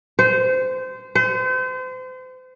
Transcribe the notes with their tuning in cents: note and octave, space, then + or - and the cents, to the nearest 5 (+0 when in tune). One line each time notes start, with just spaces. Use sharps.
C5 -25
C5 -35